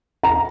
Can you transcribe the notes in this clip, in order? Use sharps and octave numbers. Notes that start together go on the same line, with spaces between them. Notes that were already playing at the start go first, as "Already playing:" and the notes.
A#5